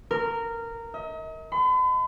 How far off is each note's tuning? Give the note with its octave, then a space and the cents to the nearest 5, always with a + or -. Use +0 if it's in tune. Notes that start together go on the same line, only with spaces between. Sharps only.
A#4 -15
D#5 +40
B5 +45